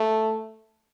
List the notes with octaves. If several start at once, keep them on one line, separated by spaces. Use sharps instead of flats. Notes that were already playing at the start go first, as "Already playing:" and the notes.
Already playing: A3